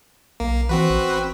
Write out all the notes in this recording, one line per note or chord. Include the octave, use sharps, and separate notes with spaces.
B1 A#3
E3 C4 F#4 B4
A1